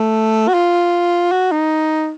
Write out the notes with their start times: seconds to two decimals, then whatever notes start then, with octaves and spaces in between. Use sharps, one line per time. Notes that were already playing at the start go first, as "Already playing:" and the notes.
Already playing: A3
0.48 F#4
0.54 F4
1.31 F#4
1.52 D#4